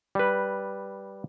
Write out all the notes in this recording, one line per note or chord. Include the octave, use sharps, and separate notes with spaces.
G3 B4